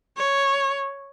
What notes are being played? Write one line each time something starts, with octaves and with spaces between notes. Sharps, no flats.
C#5